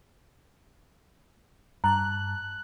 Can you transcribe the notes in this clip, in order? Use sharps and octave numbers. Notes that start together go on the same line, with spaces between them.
G2 A5 A#5 F#6